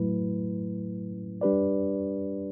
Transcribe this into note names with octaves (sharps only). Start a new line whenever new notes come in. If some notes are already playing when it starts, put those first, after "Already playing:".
Already playing: A2 F#3 A3 E4 B4
G3 D4 G4 B4 D5